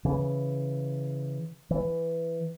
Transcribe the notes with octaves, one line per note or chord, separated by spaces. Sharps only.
C#3 E3
E3